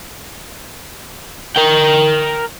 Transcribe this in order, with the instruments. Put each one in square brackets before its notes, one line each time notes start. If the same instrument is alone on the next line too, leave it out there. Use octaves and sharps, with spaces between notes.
[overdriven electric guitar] A#4 G5